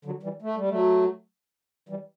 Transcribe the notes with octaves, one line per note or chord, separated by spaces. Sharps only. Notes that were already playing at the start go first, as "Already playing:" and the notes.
D3 F#3
E3 G3
A3
G3
F#3 A3
E3 G3